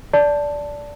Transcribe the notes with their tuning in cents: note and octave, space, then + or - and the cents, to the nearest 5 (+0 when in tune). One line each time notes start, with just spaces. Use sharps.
D5 -10 A5 +0